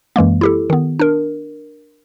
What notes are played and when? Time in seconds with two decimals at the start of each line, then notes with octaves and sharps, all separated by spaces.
0.16 F#2 E3 G#3 A#3
0.41 E4 G4 A4
0.70 D#3 B3
0.99 D4 A#4